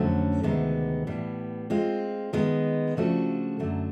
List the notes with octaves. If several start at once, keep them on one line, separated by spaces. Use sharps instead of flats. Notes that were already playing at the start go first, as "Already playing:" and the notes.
Already playing: F2 D3 F#3 A3 C#4
D2 C3 D#3 G#3 B3
A2 E3 G3 B3
G#3 C4 F4
D#3 G#3 B3
C#3 F3 A3 D4 F#4
F#2 D3 F#3 A3